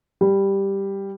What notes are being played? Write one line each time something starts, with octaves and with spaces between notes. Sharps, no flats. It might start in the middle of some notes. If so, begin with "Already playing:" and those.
G3